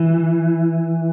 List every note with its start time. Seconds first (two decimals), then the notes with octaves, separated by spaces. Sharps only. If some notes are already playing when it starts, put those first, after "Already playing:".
Already playing: E3